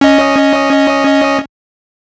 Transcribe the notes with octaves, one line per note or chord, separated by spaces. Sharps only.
C#4 D#5